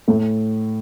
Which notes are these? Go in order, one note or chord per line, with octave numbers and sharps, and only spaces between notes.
A2 A3